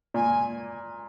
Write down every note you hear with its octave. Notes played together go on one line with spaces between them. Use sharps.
A#2 G#5